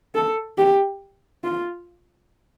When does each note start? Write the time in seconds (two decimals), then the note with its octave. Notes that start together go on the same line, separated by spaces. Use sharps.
0.15 A4
0.58 G4
1.44 F4